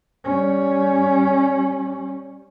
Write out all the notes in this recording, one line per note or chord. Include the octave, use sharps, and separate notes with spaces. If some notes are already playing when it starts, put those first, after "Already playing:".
G3 C#4